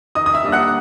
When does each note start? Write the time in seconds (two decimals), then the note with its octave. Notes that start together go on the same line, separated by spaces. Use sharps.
0.15 D#3 D#5 D#6
0.26 D#6
0.34 E5 E6
0.44 G3 A#3 D4
0.52 F#5 F#6